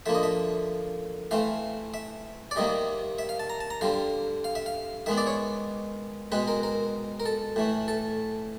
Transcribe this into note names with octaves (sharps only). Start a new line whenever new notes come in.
D3 F3 A#3 E5
D#5
E5
E3 A3 C4 F5
E5
D5
C3 D#3 G3 A#3 D#5
E5
F5
A5
A#5
A5
A#5
D3 G3 C4 F5
F5
E5
F5
D#3 G#3 B3 E5
D5
C#5
B2 G#3 C4 B4
A#4
A#4
A#4
A4
A2 E3 A3
A4